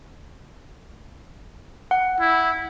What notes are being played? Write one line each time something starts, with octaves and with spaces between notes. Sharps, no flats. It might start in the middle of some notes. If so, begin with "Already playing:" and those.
F#5
E4